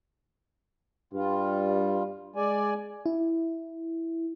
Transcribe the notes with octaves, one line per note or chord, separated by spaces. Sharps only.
G2 G3 F4
G#3 D5 G#5
E4